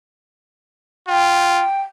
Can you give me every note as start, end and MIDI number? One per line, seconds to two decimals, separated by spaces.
1.08 1.64 65
1.08 1.81 79